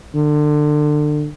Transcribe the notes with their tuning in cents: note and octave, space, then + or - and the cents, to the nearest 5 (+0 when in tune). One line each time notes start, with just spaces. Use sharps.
D3 +25